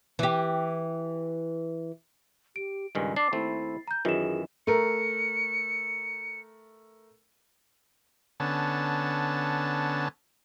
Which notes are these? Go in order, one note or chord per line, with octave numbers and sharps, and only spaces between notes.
E3 G4
G4 D7
C#2 G2 D#3 G#5
D4 D6 A6 C7
D#2 A3 C4 E4
A#5 G6
F#2 D#3 E3 F4 G#4 E7
A3 A#4 C#7
D3 B3 C#4 A5